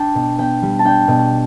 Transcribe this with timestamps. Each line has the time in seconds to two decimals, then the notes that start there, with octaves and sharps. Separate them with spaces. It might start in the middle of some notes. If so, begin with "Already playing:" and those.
Already playing: D4 G5 A5
0.15 B2
0.39 B3 G5
0.62 G3
0.79 A5
0.85 D4 G5
1.08 B2